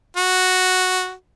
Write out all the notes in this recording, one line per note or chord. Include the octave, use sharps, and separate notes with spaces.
F#4